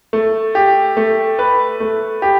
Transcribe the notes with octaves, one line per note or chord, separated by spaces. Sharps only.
A3
G4
A3
B4
A3
G4